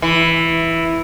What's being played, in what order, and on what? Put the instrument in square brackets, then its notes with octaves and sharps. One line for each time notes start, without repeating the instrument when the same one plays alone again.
[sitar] E3